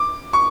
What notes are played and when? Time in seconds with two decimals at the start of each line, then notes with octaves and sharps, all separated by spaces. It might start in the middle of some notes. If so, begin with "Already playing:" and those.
Already playing: D6
0.33 C#6